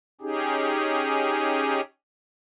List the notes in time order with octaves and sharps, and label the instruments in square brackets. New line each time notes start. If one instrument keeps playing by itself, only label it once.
[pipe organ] C#4 D#4 G4 G#4